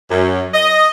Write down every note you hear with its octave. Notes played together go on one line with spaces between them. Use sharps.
F#2
D#5